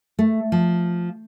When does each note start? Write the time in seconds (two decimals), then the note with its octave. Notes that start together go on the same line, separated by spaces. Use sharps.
0.19 A3
0.52 F3